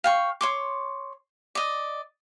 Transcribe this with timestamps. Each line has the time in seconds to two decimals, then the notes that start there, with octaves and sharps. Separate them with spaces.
0.04 F5 G5 C#6
0.41 C#5 C6 D6
1.55 D5 D#5